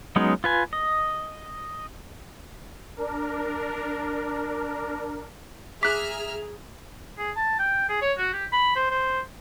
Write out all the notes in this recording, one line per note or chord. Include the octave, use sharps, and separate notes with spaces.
F#3 G#3 B3 C#4 D#4
F4 B4 G#5
D#5
D4 A#4
G#4 E5 A#5 D6 F6 F#6 B6
G#4
A5
G5
G#4
C#5
F#4
G4
B5
C5
C5